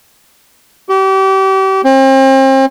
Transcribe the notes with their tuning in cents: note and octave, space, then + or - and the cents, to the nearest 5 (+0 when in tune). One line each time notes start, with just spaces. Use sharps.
G4 -35
C4 +40